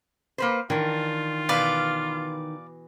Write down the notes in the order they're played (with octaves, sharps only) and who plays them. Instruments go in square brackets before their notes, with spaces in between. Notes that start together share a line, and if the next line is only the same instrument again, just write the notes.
[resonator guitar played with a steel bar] A#3 B4 C5
[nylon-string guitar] D#3 [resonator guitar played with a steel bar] E3 D4 [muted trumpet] F4
[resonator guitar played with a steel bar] B2 E3 [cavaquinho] B4 D5 F5